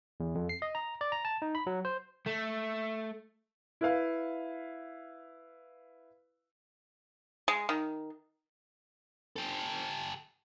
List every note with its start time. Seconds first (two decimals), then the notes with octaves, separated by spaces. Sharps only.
0.20 E2
0.35 F2
0.49 C7
0.62 D#5
0.75 A#5
1.01 D5
1.12 A#5
1.25 A5
1.42 D#4
1.55 B5
1.67 F#3
1.85 C5
2.27 A3
3.81 E4 B4 F5
7.48 G#3
7.69 D#3
9.36 G4 A4